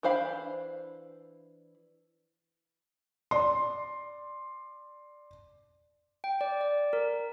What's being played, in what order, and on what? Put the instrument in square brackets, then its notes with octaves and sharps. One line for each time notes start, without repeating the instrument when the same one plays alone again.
[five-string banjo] E3 D4 C5 F5 B5
[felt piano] D5 C6
[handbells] G5
D5
D5
A#4